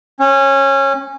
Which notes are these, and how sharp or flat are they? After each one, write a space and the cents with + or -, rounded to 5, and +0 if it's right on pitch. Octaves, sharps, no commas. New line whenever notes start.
C#4 -20